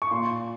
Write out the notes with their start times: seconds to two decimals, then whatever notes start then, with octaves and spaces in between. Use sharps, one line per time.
0.02 C#6
0.11 A#2 C6